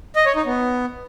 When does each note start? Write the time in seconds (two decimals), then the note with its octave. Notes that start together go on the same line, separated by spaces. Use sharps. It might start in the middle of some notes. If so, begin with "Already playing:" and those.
0.16 D#5
0.26 C#5
0.36 D#4
0.46 B3